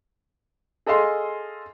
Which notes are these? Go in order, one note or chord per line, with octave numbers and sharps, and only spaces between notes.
G#4 A4 D#5 F5 C6